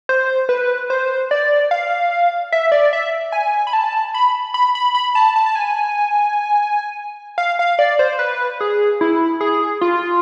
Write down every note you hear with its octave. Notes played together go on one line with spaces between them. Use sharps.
C5
B4
C5
D5
F5
E5
D5
E5
G#5
B5
A5
B5
B5
B5
B5
A5
A5
A5
G#5
F5
F5
D5
C5
B4
G#4
E4
G#4
F4